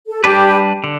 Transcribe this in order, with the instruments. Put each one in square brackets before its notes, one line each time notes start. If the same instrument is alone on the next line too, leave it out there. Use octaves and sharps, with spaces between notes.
[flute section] A4
[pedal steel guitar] G3 D4 B4 [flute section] G4
[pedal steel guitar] D3